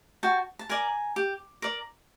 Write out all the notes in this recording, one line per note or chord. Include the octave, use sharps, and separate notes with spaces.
F#4 G5 A5
A5
A#4 D5 G#5 A#5
G4
A#4 D5